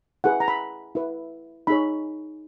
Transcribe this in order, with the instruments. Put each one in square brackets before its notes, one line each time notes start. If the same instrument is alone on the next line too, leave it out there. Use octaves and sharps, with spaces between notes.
[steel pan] E4 G#4 B4 F#5
A#5
B5
E4 B4
D#4 G#4 C#5 B5